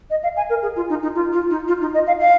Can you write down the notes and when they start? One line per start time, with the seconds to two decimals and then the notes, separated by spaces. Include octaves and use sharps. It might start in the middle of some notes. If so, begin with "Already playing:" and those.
0.10 D#5
0.23 F5
0.37 G#5
0.49 A#4
0.62 G#4
0.76 F4
0.89 D#4
1.03 D#4
1.15 F4
1.33 F4
1.50 D#4
1.68 F4
1.81 D#4
1.94 D#5
2.07 F5
2.20 F5